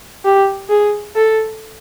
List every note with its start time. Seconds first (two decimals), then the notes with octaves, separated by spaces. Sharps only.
0.25 G4
0.69 G#4
1.16 A4